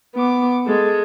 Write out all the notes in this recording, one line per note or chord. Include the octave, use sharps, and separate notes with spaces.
B3 D6
G#3 A4